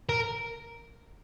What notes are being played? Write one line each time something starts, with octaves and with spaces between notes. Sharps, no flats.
A#4